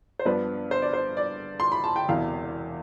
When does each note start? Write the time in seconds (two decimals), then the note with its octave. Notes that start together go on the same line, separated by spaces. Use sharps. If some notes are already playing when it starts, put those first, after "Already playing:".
0.19 C5
0.25 G2 F3 B3 D4 B4
0.71 C5
0.82 D5
0.93 C5
1.17 D5
1.60 C6
1.72 B5
1.84 A5
1.96 G5
2.08 E1 E2 C3 F5